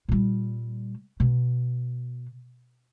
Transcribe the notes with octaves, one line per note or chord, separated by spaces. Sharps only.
A#2 G3
B2